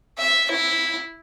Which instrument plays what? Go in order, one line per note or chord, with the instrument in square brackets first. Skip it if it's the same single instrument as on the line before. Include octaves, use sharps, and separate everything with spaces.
[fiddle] E5
E4